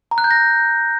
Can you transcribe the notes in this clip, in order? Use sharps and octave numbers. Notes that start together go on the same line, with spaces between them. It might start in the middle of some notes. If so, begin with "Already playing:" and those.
A#5
F#6
G6
A#6